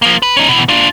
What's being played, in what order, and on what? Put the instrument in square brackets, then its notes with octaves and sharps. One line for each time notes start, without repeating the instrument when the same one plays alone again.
[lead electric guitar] F3 A#3
B4
C#4 D#4
B2 E3
D4 F4